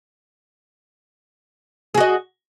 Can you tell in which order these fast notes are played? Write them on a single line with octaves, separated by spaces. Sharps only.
G#4 F#4 D#5